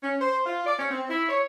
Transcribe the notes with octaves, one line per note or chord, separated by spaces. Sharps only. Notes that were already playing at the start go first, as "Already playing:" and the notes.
C#4
C5
F4
D5
C#4
C4
E4
C#5